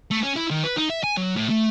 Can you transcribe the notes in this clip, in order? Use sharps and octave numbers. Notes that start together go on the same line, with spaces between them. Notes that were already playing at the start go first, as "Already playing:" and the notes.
A3
C#4
E4
D#3
B4
D#4
E5
G#5
F#3
A2
A3